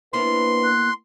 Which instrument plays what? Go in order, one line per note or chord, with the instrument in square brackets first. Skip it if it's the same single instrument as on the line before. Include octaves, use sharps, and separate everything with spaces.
[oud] A#3 B3 E4 [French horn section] D4 B4 C5 [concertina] C6
[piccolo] F#6